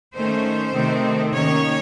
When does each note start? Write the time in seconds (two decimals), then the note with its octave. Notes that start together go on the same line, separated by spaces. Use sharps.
0.14 D#3 A3 C#4 C5
0.73 C3 D#3 A3 C4
1.33 D#3 A#3 C#4 C#5